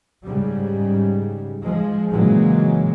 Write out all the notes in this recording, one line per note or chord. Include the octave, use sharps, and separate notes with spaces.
G#2 C#3 G3
F3 G#3
A#2 C#3 E3 F#3 G#3